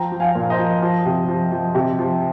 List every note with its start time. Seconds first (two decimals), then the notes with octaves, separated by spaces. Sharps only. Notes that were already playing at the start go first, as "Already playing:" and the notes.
Already playing: F3 G5 A#5
0.12 F3
0.20 F5 G#5
0.35 A#2
0.50 C5 D#5
0.59 F3
0.82 F3
1.06 C3
1.28 F3
1.52 F3
1.75 C3
1.99 F3